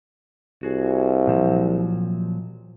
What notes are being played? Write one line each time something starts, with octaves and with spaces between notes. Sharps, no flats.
C2 F#4 G#4
A#2 F3 F#3